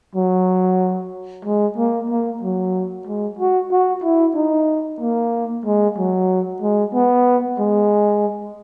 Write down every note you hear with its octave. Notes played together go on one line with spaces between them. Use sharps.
F#3
G#3
A#3
A#3
F#3
G#3
F#4
F#4
E4
D#4
A#3
G#3
F#3
G#3
B3
G#3